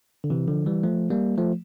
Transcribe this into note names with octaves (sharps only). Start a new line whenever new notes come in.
D3
C3 E3
D3 F3
E3 G3
F3 A3
G3 A#3
F3 A3